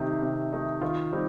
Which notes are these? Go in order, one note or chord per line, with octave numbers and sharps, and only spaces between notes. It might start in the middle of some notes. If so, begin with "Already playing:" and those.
Already playing: C3 D#3 A3 D#4 G4
C3
D#3 A3 D#4
D#3 F4
G3 C4 D#4